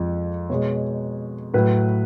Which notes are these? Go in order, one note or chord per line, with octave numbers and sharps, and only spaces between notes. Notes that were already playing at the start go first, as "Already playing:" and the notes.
Already playing: F2 F3 G#3
B2 G#3 C#5
A2 F#3 B4